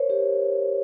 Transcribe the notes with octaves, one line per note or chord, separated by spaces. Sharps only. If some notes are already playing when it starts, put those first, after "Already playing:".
Already playing: A#4 C5 C#5
G4